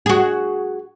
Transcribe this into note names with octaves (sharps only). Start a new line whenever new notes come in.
F#4 G#4